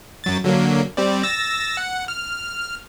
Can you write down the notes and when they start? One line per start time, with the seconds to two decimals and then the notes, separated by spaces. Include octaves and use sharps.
0.24 F#2 F#3 A6
0.44 D3 F#3 A#3
0.97 G3 C4 D5
1.23 E6 A6 A#6
1.77 F#5
2.08 F6